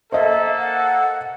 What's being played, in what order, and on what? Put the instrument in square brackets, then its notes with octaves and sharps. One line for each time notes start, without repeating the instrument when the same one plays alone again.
[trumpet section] A#3 A4 [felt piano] C5 D#5 [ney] E5
[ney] F#5